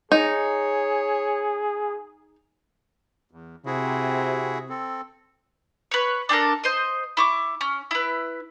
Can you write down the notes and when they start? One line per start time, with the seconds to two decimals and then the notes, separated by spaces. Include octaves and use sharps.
0.12 D#4 G#4 C#5
3.31 E2
3.66 C3 E4 F#4 G#4
4.69 C4 A4
5.91 B4 C#5
6.29 D4 G4 A4 A#4
6.64 C5 D#5
7.17 E4 C#6 D6
7.61 C#4
7.91 E4 B4